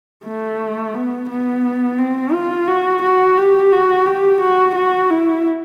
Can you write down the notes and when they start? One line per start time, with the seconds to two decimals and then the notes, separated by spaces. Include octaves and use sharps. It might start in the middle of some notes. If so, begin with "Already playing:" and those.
0.25 A3
0.94 B3
1.29 B3
1.98 C4
2.32 F4
2.68 F#4
3.02 F#4
3.37 G4
3.72 F#4
4.06 G4
4.41 F#4
4.75 F#4
5.10 E4